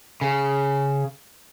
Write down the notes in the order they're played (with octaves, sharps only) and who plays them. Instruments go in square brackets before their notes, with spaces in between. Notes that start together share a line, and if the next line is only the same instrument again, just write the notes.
[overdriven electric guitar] C#3